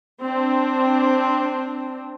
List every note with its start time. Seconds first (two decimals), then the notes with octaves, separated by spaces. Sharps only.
0.22 C4 D4